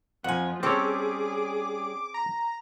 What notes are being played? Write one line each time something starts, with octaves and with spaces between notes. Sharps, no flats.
F2 F3 F#5 G#5
G3 C4 C#4 G#4 A4 C#5 D6
A#5